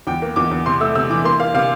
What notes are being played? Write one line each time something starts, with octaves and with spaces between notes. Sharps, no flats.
E2 G5
A#3
E2 D6
E2
C3 C6
A3 E6
C3 E6
E3 D6
A#3 C6
A#3 F5
C3 F5